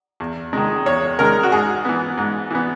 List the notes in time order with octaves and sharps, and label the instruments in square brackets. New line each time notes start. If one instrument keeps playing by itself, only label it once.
[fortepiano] E2
D#3 G#3
E2 C#5
D#3 G#3 A#4
F#4
G#2 G#4
E3 B3
G#2
E3 B3